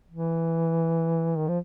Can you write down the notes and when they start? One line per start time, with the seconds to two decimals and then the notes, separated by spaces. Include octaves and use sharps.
0.11 E3
1.36 D#3
1.48 F3